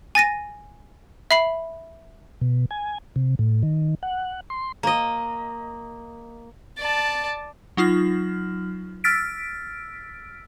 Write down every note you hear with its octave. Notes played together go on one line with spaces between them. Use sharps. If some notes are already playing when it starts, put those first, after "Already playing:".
G#5 A6 A#6 D#7
E5 B5 C7 F#7
B2
G#5
C3
A2
D#3
F#5
C6
A#3 D#5
D5 A5
F#3 D#4 F4 F6
E6 F6 A6 B6 D7